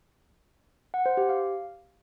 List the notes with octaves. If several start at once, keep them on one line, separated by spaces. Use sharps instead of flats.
F#5
C5
G4
F5